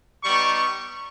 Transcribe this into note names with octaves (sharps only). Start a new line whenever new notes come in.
G3 B3 D#4 C#6
C#6